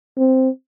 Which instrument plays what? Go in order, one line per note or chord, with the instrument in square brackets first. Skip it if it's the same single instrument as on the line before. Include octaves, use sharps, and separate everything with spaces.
[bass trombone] C4